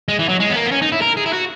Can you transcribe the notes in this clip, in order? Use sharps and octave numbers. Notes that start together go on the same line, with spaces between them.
G#3
E3
F#3
G#3
B3
A#3
B3
C#4
D#4
E4
A#4
G#4
E4
F#4